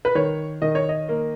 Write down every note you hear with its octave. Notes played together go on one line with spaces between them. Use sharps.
B4
D#3 C#5
D#3 D#5
C#5
D#5
A#3